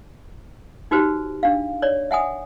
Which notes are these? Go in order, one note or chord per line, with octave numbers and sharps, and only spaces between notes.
D#4 F#4 G4 B4 C5
D4 F5
C#5 D5
E5 F#5 G#5 D#6